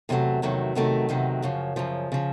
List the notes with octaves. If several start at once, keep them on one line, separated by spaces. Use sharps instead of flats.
E2 C3 D#3 F#3 A3
E2 C3 D#3 F#3 A3
E2 C3 D#3 F#3 A3
E2 C3 D#3 F#3 A3
F#2 C#3 F3
F#2 C#3 F3
C#3 F3